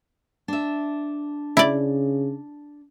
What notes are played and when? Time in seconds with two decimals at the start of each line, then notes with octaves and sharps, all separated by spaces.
0.48 D4 E5
1.57 C#3 E4 D5